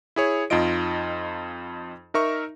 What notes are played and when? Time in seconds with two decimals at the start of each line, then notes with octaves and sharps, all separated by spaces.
0.16 E4 G#4 C#5
0.50 F2 D#4 F4 D#5 D7
2.14 D#4 A#4 E5 C#6